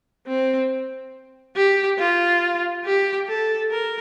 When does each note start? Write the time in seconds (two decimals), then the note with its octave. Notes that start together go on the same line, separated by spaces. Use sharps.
0.27 C4
1.55 G4
1.98 F4
2.85 G4
3.27 A4
3.71 A#4